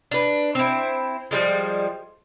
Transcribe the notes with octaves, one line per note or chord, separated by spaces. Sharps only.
D4 B4
C4 E4
F3 G3 G#3